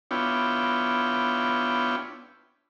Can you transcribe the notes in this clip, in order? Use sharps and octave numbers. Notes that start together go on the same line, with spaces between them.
B3 D4 E4 F4 C#5 G5